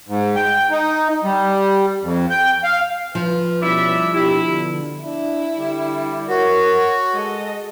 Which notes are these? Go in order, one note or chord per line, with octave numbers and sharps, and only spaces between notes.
G#2
G5
D#4
G3
F2
G5
F5
F3 B4
B2 G3 C#4 E4 D5 E5
B2 D4 E4 G4
B2 D3
D4 E4
D3 G3
F#4 A#4 C#5
G#3 A4 D#5